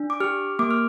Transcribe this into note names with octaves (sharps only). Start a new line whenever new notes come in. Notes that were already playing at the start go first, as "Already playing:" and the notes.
Already playing: D4
D6
G4 F6
A#3 D6
F6